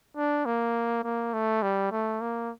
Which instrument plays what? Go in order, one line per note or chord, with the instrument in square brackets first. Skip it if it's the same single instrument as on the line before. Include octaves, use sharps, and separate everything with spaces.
[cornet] D4
A#3
A#3
A3
G3
A3
A#3